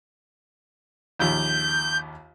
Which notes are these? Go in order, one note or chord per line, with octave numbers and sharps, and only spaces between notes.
A#1 D#2 G6